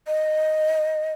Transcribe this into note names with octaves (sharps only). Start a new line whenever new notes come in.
D#5